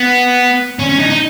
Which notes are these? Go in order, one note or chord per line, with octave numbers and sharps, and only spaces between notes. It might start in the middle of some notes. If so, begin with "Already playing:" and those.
Already playing: B3
C#4
C#4
D#4
D#4